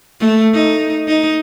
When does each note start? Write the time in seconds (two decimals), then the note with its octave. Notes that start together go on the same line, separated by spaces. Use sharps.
0.20 A3
0.54 D#4
1.08 D#4